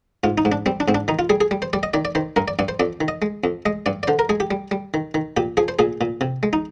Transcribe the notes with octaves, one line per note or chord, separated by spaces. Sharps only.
G#2 F4
D#4
G#2
D4
G3 C4
D4
G#2 C4
D4
D#3 D#4
F4
G3 G#4
G#4
G3
C5
G3 D5
D#5
D#3 D5
D5
D#3 C5
G2 A#4
D5
G2 D5
C5
F2 D5
D#3
D#5
G#3
F2
G#3 D#5
G2 D5
D5
D3 C5
A#4
G#3 G#4
G4
G3
G3
D#3
D#3
A#2 G4
F3 G#4
C5
A#2 G#4
A#2
C3
G#3
D#4